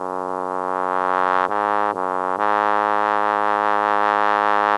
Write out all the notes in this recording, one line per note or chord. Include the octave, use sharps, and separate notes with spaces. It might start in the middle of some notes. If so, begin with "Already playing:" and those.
Already playing: F#2
G#2
F#2
G#2